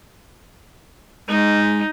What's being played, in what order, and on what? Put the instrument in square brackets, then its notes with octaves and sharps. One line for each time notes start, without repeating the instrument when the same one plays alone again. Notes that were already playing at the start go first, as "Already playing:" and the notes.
[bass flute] G#3 [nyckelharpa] D#4